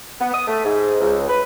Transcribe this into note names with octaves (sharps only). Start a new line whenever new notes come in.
B3
D#6
A3
G#2
C#2
B4